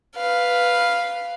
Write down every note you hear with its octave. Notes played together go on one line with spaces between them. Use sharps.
B4 F5